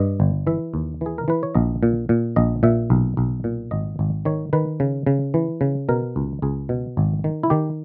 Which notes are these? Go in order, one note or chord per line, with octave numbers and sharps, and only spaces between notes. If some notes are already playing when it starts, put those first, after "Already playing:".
Already playing: G2 D#5
G1
E3 E5
D#2
E3 G#4
A#4
E3 B4
C#5
A#1 D#5
A#2
A#2
A#1 D#5
A#2 E5
B1
B1
A#2
G#1 D#5
G#1
D#3 C#5
D#3 B4
C#3
C#3
E3
C#3
B2 A#4
C#2
C#2 G#4
B2
G#1
D#3
E4
D#3 G4